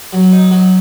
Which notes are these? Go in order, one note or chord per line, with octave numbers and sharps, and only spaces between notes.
F#3
D#4
F#3